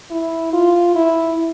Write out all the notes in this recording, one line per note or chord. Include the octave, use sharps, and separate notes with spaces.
E4
F4
E4